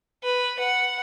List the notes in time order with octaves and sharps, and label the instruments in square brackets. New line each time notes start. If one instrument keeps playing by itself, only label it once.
[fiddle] B4
F#5